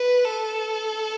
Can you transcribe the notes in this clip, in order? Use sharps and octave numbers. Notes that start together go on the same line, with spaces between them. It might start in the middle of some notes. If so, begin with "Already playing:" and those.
Already playing: B4
A4